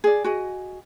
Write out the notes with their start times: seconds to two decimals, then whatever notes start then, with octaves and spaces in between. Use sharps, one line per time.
0.04 G#4 D5
0.24 F#4 G#4 D#5